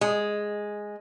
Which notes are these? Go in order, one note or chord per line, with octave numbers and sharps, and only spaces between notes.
G#3